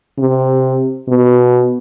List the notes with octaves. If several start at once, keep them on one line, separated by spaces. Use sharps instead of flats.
C3
B2